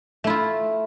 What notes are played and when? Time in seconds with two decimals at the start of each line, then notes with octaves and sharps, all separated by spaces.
0.24 A3
0.27 E4
0.30 F4